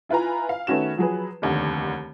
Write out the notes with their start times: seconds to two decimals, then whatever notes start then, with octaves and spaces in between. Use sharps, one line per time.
0.09 E4 F4 B4 G#5 A#5
0.49 F5
0.67 D#3 A3 B3 C#4 F#4 E7
0.97 F3 F#3 G#4 B4
1.42 F1 D#2 D3